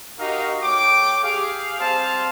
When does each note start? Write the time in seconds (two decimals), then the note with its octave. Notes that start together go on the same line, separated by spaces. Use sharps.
0.19 D#4 F#4 G4 A#4 D#5 F5
0.63 A3 C#5 G5 D6
1.23 G4 G#4 F5
1.79 G3 C4 C5 F5 A5